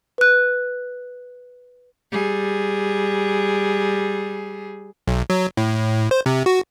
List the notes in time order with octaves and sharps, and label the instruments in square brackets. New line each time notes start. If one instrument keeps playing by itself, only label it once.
[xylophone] B4 F#6
[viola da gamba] G3 G#4
[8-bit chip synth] B1
F#3
A2
C5
C3
F#4